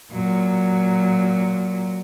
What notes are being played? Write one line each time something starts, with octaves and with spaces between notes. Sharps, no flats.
A#2 F#3